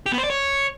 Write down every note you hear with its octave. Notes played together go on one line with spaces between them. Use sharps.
G4
B3
C5
D5
C#5